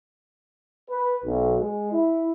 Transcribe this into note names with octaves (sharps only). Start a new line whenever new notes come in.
B4
B1
G#3
E4